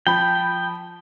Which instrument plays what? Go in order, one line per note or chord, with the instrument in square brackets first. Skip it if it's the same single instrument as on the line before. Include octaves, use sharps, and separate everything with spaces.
[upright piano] F3 B5 [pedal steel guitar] G5